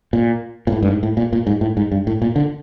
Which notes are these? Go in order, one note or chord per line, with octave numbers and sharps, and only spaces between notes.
A#2
A#2
A2
G2
G#2
A2
A#2
A#2
G#2
A2
G#2
G2
A2
A#2
D3